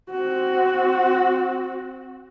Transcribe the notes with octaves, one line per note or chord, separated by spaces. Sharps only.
C4 F#4